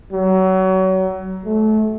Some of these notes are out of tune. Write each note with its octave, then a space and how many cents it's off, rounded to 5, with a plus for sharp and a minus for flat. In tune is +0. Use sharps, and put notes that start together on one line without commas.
F#3 +30
A3 -25